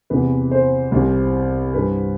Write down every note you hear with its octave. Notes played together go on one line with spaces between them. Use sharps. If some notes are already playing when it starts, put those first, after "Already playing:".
E2 C3 E3 B4
C5
C2 C3 E3
G2 E3 B4